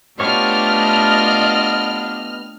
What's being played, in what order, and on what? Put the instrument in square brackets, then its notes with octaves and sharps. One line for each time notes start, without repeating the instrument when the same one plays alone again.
[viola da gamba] A3 D4 F4 [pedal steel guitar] B3 G4 C#5 [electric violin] D#5 [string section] F6